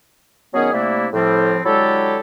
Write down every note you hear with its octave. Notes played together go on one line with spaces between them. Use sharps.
D#3 F#3 B3 C#4 G#4
C3 G3 A3 A#3 D4 E4
A2 F3 G3 C4
D3 F#3 G#3 E4 G4 A4